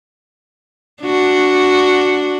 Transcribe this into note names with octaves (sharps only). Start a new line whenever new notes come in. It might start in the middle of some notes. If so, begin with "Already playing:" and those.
D4 F#4